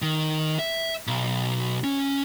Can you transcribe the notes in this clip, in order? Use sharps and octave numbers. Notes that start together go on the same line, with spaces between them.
D#3
E5
B1
C#4